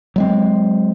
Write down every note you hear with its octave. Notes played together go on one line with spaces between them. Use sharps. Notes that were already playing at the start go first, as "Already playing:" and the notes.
F#3 G#3 C4